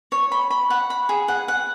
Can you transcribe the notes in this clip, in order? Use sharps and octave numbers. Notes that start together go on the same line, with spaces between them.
C#5
B5
B5
F#5
B5
G#4
F#5
F#5